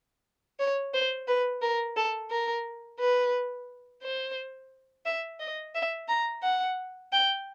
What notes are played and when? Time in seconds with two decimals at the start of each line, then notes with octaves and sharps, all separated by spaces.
0.60 C#5
0.94 C5
1.28 B4
1.62 A#4
1.97 A4
2.30 A#4
2.99 B4
4.03 C5
5.06 E5
5.40 D#5
5.75 E5
6.08 A#5
6.43 F#5
7.12 G5